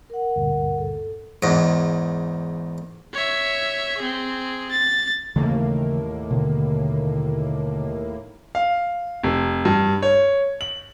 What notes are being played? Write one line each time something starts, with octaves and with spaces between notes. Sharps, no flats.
A#4 F#5
D2 G2 A#2
A4
E2 G#2
C#5 E5
C4 G#4
A6
D#2 A2 C#3 E3 A3 A#3
B2 D3 D#3
F5
F1
G2
C#5
F#7